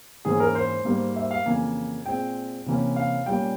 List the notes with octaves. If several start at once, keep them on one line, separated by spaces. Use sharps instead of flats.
G#2 E3 A#3 C#4 G#4
A#4
C5
G#2 G3 A#3
E5
F5
F2 C#3 E3 A#3 G#5
A#2 G#3 C4 G5
C3 E3 A#3 C#4
F5
A#2 G3 A#3 C#4 G5